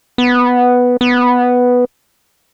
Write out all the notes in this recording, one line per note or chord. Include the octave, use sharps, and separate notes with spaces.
B3
B3